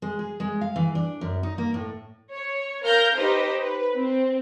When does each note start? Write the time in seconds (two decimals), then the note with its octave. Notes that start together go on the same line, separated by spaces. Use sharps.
0.02 G#3
0.19 G#4
0.40 G#3
0.61 F5
0.76 E3
0.95 D4
1.21 F#2
1.43 D#4
1.58 A#3
1.74 A2
2.32 C#5
2.84 A#4 F5 F6 G6 A#6
3.17 D#4 G4 B4 C5 D#5
3.59 B4
3.96 C4